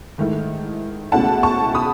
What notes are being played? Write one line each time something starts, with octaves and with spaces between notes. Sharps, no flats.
G#2 D#3 A3 E4
C#2 B2 A3 C#4 E4 F#5 A5
A5 C#6
B5 D#6